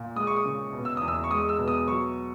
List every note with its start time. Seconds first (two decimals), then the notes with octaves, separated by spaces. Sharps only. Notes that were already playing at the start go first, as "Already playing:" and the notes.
Already playing: A#2
0.16 G#3 D#6
0.27 C#6
0.37 D#6
0.45 C#3
0.73 B2
0.85 E6
0.97 E2 D#6
1.08 E6
1.24 C#6
1.31 G#3 D#6
1.49 E6
1.59 B2
1.68 D#6
1.88 F#3 C#6